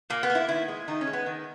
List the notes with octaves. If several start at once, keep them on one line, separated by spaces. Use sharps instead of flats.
A#2 A#3
B3
A#3
E4
D#3 E4
G#3
D#3 D#4
C#4
G#3
B3
D#3